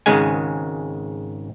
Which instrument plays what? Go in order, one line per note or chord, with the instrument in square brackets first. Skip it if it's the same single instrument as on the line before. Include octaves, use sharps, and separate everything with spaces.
[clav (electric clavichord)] G#1 G#2 C#3 G#3 G#5